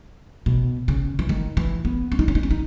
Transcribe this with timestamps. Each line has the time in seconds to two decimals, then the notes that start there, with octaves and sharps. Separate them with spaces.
0.46 B2
0.88 C#3
1.19 E3
1.29 D#3
1.57 E3
1.85 B3
2.12 C#4
2.19 D#4
2.28 C#4
2.35 D#4
2.43 C#4
2.51 D#4